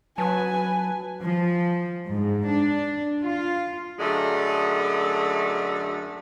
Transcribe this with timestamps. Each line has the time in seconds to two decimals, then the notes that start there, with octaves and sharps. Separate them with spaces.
0.18 F#3 B4 G#5 A5
1.25 F3
2.10 G#2
2.48 D4
3.21 F4
3.99 F#2 D3 G#3 A3